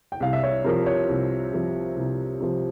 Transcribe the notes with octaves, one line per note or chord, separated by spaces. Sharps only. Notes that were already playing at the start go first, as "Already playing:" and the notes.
G5
C2 F5
E5
C#5
C3 F3 A#4
C#5
C2
C3 F3
C2
C3 F3